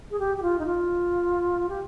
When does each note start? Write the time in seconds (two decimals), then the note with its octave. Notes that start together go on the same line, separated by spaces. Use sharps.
0.11 G#4
0.19 G4
0.37 G4
0.42 F4
0.59 D#4
0.66 F4
1.69 G4